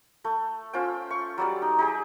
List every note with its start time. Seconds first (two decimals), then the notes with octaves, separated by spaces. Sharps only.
0.24 A3
0.73 C#4 F4 C5 G5
1.11 C#6
1.38 F#3 G3 D5
1.62 D#4
1.79 D#4 G4 G#4